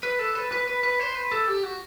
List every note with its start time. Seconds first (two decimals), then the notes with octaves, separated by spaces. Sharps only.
0.03 B4
0.19 A4
0.35 B4
0.52 B4
0.67 B4
0.83 B4
0.99 C5
1.15 B4
1.31 A4
1.48 G4
1.63 F#4